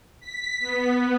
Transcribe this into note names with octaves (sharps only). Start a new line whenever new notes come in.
B6
B3